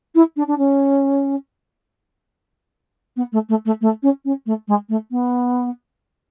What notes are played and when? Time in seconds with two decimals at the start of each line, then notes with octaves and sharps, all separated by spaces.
0.15 E4
0.36 D4
0.47 D4
0.58 C#4
3.16 B3
3.32 A3
3.49 A3
3.65 A3
3.81 A3
4.02 C#4
4.25 C#4
4.46 A3
4.68 G#3
4.89 A3
5.11 B3